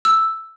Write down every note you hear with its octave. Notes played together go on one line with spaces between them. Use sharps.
E6